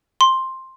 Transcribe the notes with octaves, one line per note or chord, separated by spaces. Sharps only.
C6